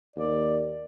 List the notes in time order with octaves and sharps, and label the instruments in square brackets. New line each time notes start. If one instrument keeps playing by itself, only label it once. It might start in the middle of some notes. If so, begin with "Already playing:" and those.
[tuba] D#2 [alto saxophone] D5